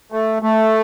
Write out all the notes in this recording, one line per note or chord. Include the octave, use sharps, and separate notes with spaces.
A3
A3